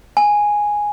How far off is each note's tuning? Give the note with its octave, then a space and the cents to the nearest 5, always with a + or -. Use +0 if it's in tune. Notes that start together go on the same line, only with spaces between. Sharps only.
G#5 +0